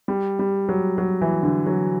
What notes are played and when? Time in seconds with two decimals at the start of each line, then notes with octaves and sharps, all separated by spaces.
0.08 G3
0.39 G3
0.69 F#3
0.98 F#3
1.21 E3
1.43 D3
1.66 F#3